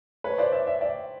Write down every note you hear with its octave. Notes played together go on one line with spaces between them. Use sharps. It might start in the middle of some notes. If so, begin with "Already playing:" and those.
B4 C#5
C5 D5
D5 E5
D5 E5
D5 E5